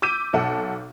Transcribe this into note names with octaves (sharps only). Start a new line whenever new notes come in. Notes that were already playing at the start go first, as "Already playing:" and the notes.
D6 E6 G6 B6 D#7
B1 A4 E5 F#5